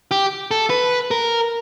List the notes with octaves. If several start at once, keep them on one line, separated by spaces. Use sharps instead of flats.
G4
A4
B4
A#4